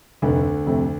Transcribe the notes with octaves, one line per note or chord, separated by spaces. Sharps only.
F1 D2 D3
F2 C3 A3